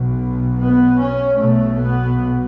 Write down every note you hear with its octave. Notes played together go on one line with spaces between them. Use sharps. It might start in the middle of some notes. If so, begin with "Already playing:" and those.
Already playing: B1 B2
B3
C#4
B1 B2 A3
B3